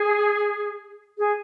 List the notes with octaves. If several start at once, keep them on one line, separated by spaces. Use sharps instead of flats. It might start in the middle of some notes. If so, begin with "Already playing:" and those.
Already playing: G#4
G#4